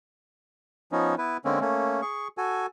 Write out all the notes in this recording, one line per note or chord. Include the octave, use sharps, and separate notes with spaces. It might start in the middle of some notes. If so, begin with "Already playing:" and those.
F3 B3 C#4 D#4
B3 E4 B4
D3 G#3 A#3 C4 C#4
A3 A#3 C#4
G#4 C#6
F#4 A4 G#5